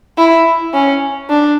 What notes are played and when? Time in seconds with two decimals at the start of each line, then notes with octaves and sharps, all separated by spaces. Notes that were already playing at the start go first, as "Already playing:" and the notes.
0.18 E4
0.73 C#4
1.29 D4